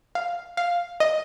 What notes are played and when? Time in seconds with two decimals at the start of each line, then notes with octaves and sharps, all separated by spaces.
0.15 F5
0.57 F5
1.00 D#5